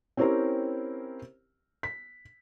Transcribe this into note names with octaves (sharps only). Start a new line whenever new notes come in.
C4 C#4 E4 G4 A#4 C5
B6